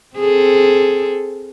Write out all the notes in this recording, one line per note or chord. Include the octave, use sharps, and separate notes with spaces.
C4 G#4 A4